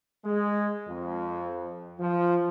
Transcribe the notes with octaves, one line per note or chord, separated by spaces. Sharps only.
G#3
F2
F3